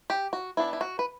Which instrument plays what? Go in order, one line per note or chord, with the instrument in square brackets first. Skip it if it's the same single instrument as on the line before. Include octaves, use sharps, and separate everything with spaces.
[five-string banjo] G4
F#4
E3 B3 D4 E4
E4
F#4
B4